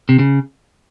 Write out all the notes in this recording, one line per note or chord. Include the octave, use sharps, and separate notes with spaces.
C3
C#3